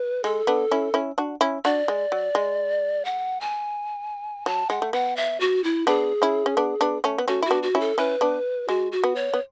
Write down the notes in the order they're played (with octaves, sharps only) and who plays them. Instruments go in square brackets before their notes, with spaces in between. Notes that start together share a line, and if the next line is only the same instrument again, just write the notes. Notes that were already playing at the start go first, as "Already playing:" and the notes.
Already playing: [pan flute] B4
[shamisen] G#3 [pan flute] A4
[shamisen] B3 D4
C#4 E4
C#4 E4
D4 F#4
C#4 E4
[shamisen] D4 F#4 [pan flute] D5
[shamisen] G#3
F#3
G#3
[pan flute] F#5
G#5
[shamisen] F#3 [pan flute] A5
[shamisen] G#3 [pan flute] F#5
[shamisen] A3
[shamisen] B3 [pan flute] F#5
[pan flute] E5
F#4
E4
[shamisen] B3 D4 [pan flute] G#4
[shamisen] C#4 E4
C#4
B3 D4
B3 D4
A3 C#4
B3
[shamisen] A3 C#4 [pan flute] F#4
[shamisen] E4 [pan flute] F#4
[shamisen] B3 D4
[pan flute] F#4
[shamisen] C#4 E4
[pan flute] A4
[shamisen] C#4 E4 [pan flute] B4
[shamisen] B3 D4
[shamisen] G#3 [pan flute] F#4
[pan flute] F#4
[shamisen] B3
[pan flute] C#5
[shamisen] B3